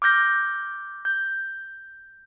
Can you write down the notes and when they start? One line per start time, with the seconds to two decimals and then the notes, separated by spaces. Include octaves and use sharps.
0.02 D6 F6 G6 A#6
1.05 G6